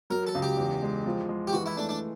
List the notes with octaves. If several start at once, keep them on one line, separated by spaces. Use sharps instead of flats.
F#3 A#4
A4
C#2
G4
E2
G#3
F3
G#3
G4
E3 F#4
E4
A3 D4
D4